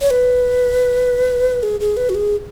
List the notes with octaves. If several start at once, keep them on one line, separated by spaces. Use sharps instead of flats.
C#5
B4
G#4
G#4
B4
F#4
G#4